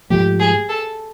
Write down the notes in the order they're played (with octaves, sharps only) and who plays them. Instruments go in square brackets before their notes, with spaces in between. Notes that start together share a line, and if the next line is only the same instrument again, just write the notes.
[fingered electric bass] G#2 F3 A3 [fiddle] G4
[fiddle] G#4
A4